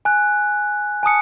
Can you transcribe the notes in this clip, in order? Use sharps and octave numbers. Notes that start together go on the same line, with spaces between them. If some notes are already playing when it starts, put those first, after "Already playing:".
G#5 F#6
G#5 A5 D#6 C#7